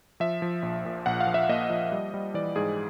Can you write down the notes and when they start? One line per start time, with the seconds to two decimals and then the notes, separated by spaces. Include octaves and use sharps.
0.20 F3 E5
0.42 F3
0.63 A#1
0.85 A#2
1.06 A#1 F#5
1.20 F5
1.27 F3
1.34 E5
1.49 A#3 D#5
1.70 F3
1.92 G3
2.14 G3
2.34 E3 D5
2.56 G#2 G#4